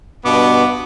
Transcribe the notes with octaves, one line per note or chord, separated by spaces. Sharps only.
G2 B2 B3 D6